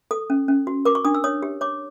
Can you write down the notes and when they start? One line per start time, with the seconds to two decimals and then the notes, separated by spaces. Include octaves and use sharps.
0.11 A4 D#6
0.30 C#4
0.48 C#4
0.67 F#4
0.85 A#4 D6
0.95 C#6
1.05 D4 D#6
1.14 E6
1.24 C#5 D#6
1.42 G4
1.61 C#5 D6